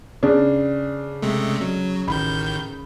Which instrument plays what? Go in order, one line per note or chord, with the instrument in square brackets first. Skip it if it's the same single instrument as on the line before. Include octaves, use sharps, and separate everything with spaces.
[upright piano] C#3 [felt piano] D4
[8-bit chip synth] C3 G#3 A3
F#3
[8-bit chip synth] A1 D#3 G6 [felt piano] B5